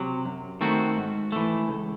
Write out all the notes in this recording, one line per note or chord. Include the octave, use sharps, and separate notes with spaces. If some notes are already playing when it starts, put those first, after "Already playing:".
Already playing: C3 F#3
F#2
D#3 A3 C4 F#4
G#2
E3 A3
C#2